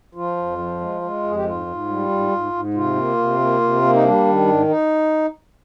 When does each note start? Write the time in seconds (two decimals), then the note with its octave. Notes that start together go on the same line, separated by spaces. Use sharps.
0.15 F3 F4
0.37 F2
0.58 F3
0.80 G#3
1.01 G#3
1.23 F2 G#4
1.35 G4
1.44 G#2 F4
1.66 G#2
1.88 G3
2.09 G#2
2.31 G#2
2.53 G#2
2.74 C3 F4
2.95 A#3
3.17 C3
3.39 A#3
3.61 C3
3.82 A#3
3.93 D#4
4.03 G3 D4
4.26 D#3
4.47 G#2
4.68 D#4